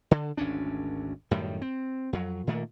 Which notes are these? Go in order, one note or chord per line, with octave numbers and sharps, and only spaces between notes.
D3
G#1 D2 C#4 D4
F#2 A2 D#3 G3
C4
F2 F#3
A#2 D#3 A3 A#3